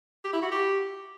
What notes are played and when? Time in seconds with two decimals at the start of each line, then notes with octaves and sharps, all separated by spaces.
0.24 G4
0.33 E4
0.42 F#4
0.51 G4